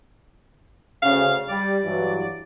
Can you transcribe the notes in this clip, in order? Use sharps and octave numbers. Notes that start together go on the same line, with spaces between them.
D2 C#3 F5
G3 D5
G2 E3 F#3